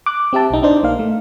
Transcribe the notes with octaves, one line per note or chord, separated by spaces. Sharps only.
D6 F#6
C4 G4 E5 A5
B1 D#4
D4 D#4 C5 D5
A#1 A#3 F5
A3